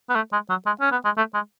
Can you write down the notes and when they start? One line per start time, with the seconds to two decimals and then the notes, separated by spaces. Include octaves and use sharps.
0.09 B3
0.15 A3
0.33 G#3
0.49 F#3
0.66 G#3
0.81 C#4
0.92 B3
1.05 G#3
1.17 A3
1.34 G#3